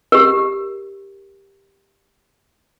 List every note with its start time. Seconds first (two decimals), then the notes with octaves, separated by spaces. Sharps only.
0.12 G4 A#4